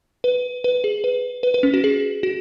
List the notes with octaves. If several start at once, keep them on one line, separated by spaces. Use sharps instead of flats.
B4
B4
G#4
B4
B4
B4
C#4
F#4
G#4
F#4